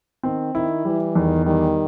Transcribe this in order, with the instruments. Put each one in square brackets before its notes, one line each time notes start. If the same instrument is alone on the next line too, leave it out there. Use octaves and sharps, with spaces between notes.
[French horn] D#3 [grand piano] C4
[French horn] D#3 [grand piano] E4
[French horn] E3 [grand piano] G3
[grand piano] E2 [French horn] D#3
[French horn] D#3 [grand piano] G3